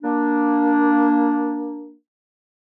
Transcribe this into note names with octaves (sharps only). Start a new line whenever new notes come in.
A#3 D4